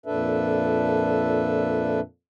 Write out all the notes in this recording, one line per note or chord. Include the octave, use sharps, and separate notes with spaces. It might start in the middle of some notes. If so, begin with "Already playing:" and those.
F2 A#2 D4 A4 B4 E5